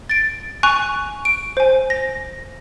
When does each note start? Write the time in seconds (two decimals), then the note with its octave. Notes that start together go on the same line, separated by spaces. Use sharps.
0.10 A6 D7
0.63 G#5 C#6 F#6 F7
1.25 D7
1.57 C5 G#5
1.90 A#6